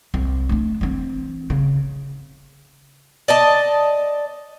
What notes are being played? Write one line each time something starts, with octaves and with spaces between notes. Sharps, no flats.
C2
A3 D4
E3 C4
C#3
D5 D#5 A5